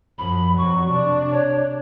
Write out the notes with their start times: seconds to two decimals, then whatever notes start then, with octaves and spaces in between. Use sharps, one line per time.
0.18 F#2 F3 B5
0.58 F2 F#3 C#6
0.91 C3 D4
1.31 C#5